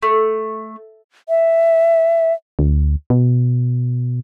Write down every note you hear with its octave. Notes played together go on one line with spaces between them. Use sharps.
A3
E5
D2
B2